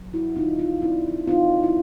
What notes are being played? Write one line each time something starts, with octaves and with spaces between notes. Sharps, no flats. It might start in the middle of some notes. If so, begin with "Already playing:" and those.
Already playing: F#3
E4 F#4
D3 D#4 F4
D#4 F4
C4 D4 E4
C4 D#4 F4
E4